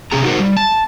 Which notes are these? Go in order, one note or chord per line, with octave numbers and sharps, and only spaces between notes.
C3 C#4 G#4 A#5
D#4 F4 F#4 G#4 A#4 C5
G3
A5